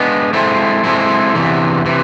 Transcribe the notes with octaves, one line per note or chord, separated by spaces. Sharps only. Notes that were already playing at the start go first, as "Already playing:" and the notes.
Already playing: G#3 B3 D4
G#3 C4 E4 A4 C5
G#3 C4 E4 A4 C5
E2 C3 E3
C3 E3